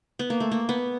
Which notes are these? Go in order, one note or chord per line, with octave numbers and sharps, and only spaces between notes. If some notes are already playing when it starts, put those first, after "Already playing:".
B3
A#3
A3
A#3
B3